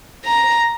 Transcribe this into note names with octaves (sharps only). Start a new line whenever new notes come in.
A#5